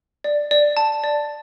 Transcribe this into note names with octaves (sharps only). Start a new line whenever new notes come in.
D5
D5
A5
D5